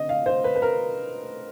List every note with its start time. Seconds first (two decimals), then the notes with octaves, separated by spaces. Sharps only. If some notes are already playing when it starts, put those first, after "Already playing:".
Already playing: D3 C4 D#5
0.09 F5
0.26 C5
0.44 B4
0.56 B4
0.62 A#4